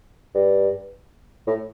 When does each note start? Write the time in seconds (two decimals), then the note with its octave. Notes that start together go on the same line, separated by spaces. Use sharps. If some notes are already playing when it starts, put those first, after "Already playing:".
0.35 G2
1.47 A2